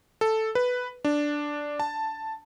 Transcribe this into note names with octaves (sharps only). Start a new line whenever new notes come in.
A4
B4
D4
A5